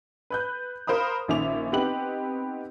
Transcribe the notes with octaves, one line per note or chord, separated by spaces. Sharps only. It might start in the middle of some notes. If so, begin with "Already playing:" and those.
B4 F#6 G6
A#4 C5 F5 B5 D#6
A#1 D#3 C#4 E5 D6 F7
B3 C4 D#4 G4 B4 F#7